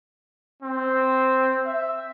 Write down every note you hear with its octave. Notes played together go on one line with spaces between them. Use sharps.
C4
E5